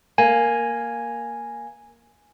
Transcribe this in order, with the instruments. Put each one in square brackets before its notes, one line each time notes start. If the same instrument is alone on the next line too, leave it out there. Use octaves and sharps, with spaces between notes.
[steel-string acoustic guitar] A#3 [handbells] G#5